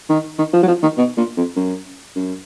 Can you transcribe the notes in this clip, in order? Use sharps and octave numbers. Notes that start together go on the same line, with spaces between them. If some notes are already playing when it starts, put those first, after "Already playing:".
D#3
D#3
F3
F#3
F3
D#3
B2
A#2
F2
F#2
F#2